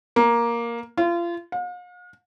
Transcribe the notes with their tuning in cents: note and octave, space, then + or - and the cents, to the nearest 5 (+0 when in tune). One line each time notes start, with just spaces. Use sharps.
A#3 +5
F4 -30
F5 +45